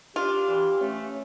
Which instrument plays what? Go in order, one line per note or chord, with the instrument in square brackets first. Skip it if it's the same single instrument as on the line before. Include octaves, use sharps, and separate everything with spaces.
[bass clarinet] D4 [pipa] F4 [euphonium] G4
[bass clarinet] E3
[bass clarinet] A3 [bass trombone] C#4